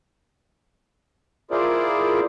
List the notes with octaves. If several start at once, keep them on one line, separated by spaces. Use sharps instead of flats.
E4 F4 G#4 A#4 C5 D5